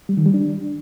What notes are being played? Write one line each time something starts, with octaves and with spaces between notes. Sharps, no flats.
G3
D#3
G3
D4